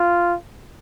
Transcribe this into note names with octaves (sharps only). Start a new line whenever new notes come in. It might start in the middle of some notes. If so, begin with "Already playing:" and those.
Already playing: F4